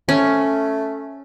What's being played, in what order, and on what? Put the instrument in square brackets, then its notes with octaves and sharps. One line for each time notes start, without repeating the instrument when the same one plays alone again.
[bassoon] A3 [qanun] C#4